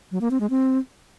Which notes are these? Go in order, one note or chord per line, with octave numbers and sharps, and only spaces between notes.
F#3
A#3
C4
G#3
C4